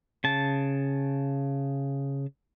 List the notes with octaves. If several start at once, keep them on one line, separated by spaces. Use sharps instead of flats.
C#3 A5